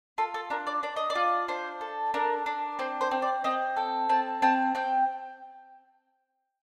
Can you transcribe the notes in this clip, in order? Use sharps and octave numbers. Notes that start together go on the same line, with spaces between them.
F4 A4
A4
D4 A#4
D5
D4 D5
D#5
D5
F4
D4 C5
A4
D4 A#4
D4
C4 C5
C5
C4
D5
C4 D#5
A4 G5
C4 A5
C4 A5
C4 G5